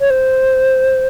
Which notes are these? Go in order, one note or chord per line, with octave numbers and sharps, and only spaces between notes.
C#5
C5